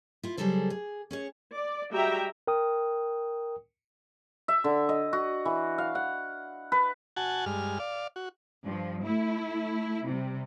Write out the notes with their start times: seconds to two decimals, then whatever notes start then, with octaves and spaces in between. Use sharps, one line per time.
0.23 E4 F4
0.37 C#3 F#3 G3 G#4 A4 C5
0.70 G#4
1.11 C#4 G#4 C#5
1.53 D5
1.92 G3 G#3 F#4 E5 G5 A#5
2.47 A#4 G5 D#6
4.48 E5
4.64 D3
4.89 D#5
5.13 F#4
5.45 E3
5.78 F5
5.95 F#5
6.72 B4
7.17 F#4 F#5 G#5 A5
7.46 G2 G#3 F6
7.79 D5 F5
8.16 F#4
8.65 G2 F3
9.05 A3 E4
10.06 C3 G3